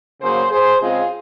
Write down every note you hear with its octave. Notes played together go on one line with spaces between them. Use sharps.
C#3 F#3 A#3 G#4 C5
G#4 C5
C#3 G#3 C4 F4 G#4